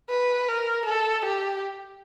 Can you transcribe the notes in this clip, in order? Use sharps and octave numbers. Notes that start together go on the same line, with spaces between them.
B4
A#4
A4
G4